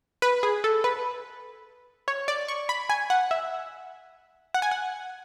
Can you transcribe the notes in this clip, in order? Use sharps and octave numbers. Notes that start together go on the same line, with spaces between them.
B4
G#4
A4
B4
C#5
D5
C#6
B5
G#5
F#5
E5
F#5
G#5
F#5